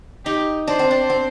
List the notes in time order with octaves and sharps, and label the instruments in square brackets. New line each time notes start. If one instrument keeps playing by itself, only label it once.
[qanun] D#4 [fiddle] G4
[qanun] D4 [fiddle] C5
[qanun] C4
D4
C4